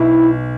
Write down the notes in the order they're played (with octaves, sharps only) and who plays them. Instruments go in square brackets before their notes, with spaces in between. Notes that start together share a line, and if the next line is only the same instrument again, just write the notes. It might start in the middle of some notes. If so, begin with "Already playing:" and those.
Already playing: [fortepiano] B1 [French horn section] E4